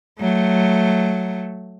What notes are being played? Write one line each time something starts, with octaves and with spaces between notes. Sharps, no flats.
F#3 A3